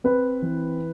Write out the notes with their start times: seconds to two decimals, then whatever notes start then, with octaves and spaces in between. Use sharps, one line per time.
0.04 C4 B4
0.42 E3